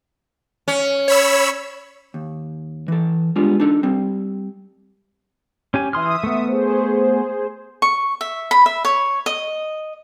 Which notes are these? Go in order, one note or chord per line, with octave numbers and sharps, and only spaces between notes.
C#4
C#5 B5 E6
D#2
E3 A4
G3 G#3 B3 D4 F4
D4 D#4 A4
G3 C4
C#4 G4 G#5
E3 E5 C6 D#6 F6
A3 B3
G#4 C5
C#6
E5
B5
E5
C#5
D#5